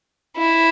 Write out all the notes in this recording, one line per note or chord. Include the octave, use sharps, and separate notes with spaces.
E4